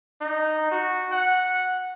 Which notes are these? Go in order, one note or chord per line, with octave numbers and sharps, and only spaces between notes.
D#4
F#4
F#5